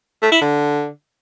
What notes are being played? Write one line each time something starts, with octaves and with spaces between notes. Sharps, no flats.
A3
E4
D3